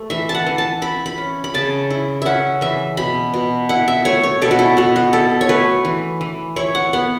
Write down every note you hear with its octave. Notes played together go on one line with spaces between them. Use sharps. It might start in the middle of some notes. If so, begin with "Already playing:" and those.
Already playing: A3
E3 E5
A5
F#5
E3
A5
E4 B5
B5
C#4
B5
C#3 A5
E4
C#4 E5 F#5
E3 E5
B2 B5
B2
E4 F#5
E5
A3 C#5
C#5
B2 A4
F#4
E4
B2 F#4
F#4
E4 A4
C#5
A3 B4
E3
E3
E4 C#5
F#5
B3 F#5